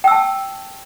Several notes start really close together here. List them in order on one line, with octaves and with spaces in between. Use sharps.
G5 E6 A5